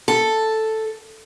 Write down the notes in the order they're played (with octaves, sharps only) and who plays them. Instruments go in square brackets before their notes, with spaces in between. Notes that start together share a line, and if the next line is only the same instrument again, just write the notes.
[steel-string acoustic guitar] A4